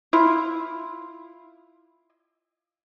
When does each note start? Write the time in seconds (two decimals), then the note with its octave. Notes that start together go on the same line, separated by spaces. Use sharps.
0.13 E4 F4